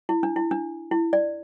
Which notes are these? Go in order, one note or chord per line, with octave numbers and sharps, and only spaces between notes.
E4
D4
E4
D4
E4
D5